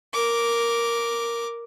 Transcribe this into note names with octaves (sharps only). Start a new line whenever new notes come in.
A#4 D6